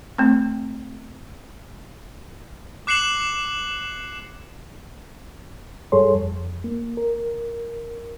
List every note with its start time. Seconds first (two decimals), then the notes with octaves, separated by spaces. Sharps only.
0.18 A3 C4
2.87 D6 F#6 C7 C#7 E7 F#7
5.92 G2 G3 G#4 A4 C#5 C6
6.14 F2
6.64 A#3
6.97 A#4